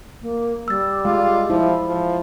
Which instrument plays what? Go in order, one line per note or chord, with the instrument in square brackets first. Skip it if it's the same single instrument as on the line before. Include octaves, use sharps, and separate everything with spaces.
[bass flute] A#3
[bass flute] G3 [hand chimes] E6 A6
[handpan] G#3 [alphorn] F4
[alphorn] F3 [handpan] E4
[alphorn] F3